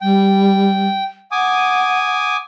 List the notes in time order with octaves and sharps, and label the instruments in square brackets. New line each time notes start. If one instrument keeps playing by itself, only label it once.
[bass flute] G3 [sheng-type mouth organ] G5
[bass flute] F#5 [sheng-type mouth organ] G#5 D6 D#6